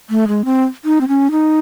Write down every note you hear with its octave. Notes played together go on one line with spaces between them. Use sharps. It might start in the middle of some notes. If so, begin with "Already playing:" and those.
A3
G#3
C4
D#4
C4
C#4
D#4